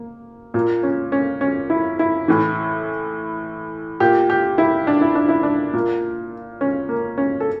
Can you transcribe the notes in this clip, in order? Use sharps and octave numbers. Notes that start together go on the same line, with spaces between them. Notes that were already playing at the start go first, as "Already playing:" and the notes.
Already playing: A#3
A#2 A#3
C#4
C#4
C#4
E4
E4
A2 E3
A#2 G4
G4
E4
D4
E4
D4
E4
D4
A#2 A#3
C#4
A#3
C#4
A4